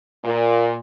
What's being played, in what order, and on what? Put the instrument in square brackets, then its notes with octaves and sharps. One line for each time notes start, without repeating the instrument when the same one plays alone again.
[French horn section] A#2